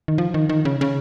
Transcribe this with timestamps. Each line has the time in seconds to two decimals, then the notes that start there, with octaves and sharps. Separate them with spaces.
0.08 D#3
0.18 F3
0.34 D#3
0.49 D#3
0.65 C#3
0.81 C#3